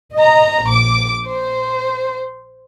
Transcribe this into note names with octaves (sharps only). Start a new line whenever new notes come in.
D#5 A#5
A#1 D6
C5